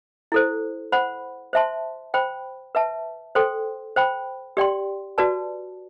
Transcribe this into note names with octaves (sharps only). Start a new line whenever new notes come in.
E4 A4 C5
C5 F#5 B5
C5 E5 A5 C6
C5 G5 B5
B4 E5 A5
A4 C5 G5 C6
C5 G5 B5
G4 D5 G5 C6
F#4 B4 D5 A5